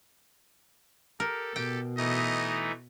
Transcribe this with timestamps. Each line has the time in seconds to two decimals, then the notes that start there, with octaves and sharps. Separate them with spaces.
1.20 G4 A4 A#4
1.56 B2 G4 G5
1.97 E3 A3 D#4 D#5